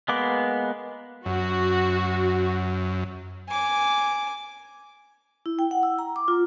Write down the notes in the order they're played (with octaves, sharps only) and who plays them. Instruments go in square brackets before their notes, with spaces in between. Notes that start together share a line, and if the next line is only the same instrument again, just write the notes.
[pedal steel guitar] G#3 A#3 B3 D6
[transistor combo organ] F#2 [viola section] F#4
[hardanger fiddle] G#5 D6
[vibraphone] E4
G5
F#5
E6
A#5
D6
F4